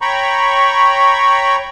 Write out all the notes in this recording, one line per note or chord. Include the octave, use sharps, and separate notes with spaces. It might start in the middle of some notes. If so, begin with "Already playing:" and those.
C#5 G5 A#5 B5 C#6